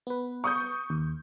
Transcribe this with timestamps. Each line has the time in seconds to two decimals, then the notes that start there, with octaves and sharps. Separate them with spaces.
0.07 B3 B4
0.44 C#6 D#6 G6
0.90 D#2